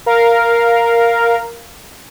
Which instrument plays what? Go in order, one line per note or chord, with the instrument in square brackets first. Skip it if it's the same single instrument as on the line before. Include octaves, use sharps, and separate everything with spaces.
[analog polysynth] A#4 F5